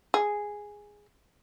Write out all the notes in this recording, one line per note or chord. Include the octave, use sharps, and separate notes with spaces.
G#4